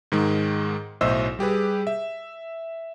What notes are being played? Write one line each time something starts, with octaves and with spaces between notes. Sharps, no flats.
G#2 D#3 G#3
B1 A2 C5 D#5 E5 E6
G3 G4 G#4 B4
E5